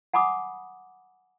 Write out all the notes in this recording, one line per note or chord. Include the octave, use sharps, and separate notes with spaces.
F#5 G#5 B5 D6 D#6